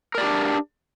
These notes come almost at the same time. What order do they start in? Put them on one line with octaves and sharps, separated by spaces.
A#4 D5 G4 D4